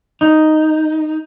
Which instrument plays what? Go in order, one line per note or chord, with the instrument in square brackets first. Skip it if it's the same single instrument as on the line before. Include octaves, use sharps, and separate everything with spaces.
[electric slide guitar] D#4